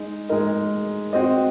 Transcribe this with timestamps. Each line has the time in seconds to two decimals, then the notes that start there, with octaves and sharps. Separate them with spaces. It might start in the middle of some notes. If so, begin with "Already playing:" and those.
Already playing: G#3 D#4
0.29 G#3 D#4 A#4 D#5
1.13 C4 F#4 C5 D#5